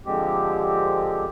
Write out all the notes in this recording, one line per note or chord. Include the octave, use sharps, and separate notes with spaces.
D3 F3 G#3 C4 G4